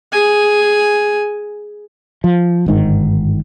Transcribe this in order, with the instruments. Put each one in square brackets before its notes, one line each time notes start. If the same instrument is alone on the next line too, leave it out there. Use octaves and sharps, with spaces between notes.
[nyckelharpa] G#4 G#5
[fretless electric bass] F3
G1 G#2 D#3